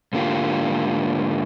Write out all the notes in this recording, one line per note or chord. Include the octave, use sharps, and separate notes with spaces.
G#2 D3 A#3 F4 G4